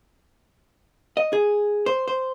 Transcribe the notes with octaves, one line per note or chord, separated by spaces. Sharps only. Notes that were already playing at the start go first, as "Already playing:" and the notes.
D#5
G#4
C5
C5